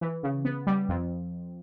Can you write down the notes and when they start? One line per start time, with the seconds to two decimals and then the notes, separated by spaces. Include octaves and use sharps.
0.01 E3
0.23 C#3
0.45 B3
0.67 G3
0.89 F2